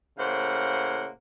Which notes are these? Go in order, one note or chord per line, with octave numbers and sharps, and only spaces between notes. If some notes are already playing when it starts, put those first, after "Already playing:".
A2 C#3 A#3 C5 F5 F#5